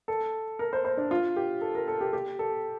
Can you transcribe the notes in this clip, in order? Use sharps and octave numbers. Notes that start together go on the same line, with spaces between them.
A4
A#4
C5
C5
D4
F4
G4
A4
A#4
A4
G4
G4
A4